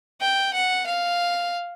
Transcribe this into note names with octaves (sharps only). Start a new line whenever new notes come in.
G5
F#5
F5